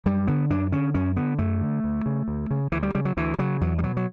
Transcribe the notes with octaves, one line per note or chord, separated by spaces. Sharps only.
F#2 G3
D3 B3
F#2 D4
D3 C#4
F#2 C#4
D3 B3
F#2 A3
D3
D2
C#3
D2
C#3
D2 E3
G3
C#3 G3
F#3
D2 E3
C#3 F#3
E2 F#3
G3
B2 F#3
F#3